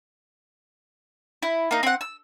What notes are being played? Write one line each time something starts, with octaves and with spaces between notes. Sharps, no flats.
E4
A#3 D#4
C4 F#5
E6